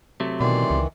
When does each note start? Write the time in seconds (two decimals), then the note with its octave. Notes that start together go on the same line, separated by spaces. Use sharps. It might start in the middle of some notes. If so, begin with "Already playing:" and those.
0.20 C3 F#3 A3
0.41 B2 D#3 E3 D5 C6
0.70 C#2